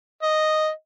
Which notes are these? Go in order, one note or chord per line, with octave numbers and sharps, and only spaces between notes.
D#5